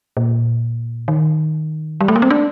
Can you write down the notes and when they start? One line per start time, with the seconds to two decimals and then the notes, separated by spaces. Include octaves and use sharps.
0.17 A#2
1.08 D#3
2.01 G3
2.08 A3
2.16 A#3
2.22 C4
2.30 D4